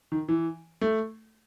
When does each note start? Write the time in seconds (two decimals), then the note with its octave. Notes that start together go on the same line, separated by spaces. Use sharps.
0.12 D#3
0.28 E3
0.81 A3